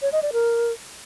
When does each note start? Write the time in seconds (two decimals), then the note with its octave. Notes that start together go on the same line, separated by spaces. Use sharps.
0.02 C#5
0.12 D#5
0.23 D5
0.33 A#4